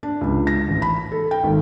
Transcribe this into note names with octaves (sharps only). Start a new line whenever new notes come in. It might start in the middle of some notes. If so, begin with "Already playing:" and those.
D4
C#2
A#6
A1
B5
A4
G5
G#1